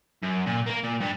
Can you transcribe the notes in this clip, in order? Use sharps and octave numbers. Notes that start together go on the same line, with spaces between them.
F#2
A#2
A#3 A#4
A#2
G2 G3